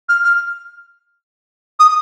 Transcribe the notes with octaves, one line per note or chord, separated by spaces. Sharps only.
F6
F6
D#6